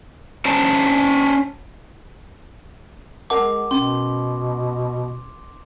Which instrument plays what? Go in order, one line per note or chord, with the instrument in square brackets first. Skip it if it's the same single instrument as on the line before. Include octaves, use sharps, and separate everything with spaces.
[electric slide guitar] C#4 C5 C#5 A5 A#5
[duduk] G#3 [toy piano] A#4 F#5 A5 [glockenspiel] D6
[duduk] B2 [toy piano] C#4 [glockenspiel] C6